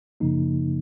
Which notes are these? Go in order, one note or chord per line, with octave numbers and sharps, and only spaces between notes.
F#2 C#3 F3 A#3 D#4